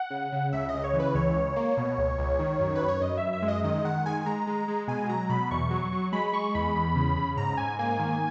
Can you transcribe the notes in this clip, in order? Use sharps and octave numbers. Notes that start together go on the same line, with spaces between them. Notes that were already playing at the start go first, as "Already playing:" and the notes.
Already playing: F#5
C#3
C#3
C#2 E5
D#5
C#3
C#5
E3
B4
C#2 C#5
C#2
A#3
B2
C#2
C#2
D#3
F#2
B4
F#2
C#5
F#2 D#5
E5
F#2
E5
G#3
D#5
D#3 D#5
D#3 F#5
G#3 G#5
G#5
G#3 A#5
G#3
G#3
B2 G#5
F#3 A#5
B2 B5
E2 C#6
F#3
F#3
G#3 B5
B5
G#3 C#6
E2 B5
E2
C#3
C#3
G#2 A#5
G#2 G#5
A#3 G#5
D#3